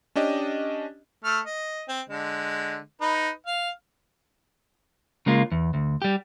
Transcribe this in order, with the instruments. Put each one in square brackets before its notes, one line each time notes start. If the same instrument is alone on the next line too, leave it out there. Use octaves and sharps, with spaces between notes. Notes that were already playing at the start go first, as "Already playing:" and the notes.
[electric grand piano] C#4 D4 G4 D#5
[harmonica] A3 F6
D#5
C4
D3 G#3
D#4 B4
F5
[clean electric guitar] C#3 G#3 A#3 F4
E2
D2
G3 G4